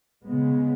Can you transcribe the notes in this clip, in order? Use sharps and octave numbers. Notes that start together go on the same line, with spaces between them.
C#3 G#3 B3